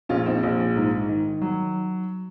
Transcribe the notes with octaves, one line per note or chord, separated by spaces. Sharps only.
A#1 C#4 F4
C4 D#4
A#1
G#2
D#3
F#3